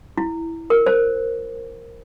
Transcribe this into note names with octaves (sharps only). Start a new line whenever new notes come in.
E4
A#4
C5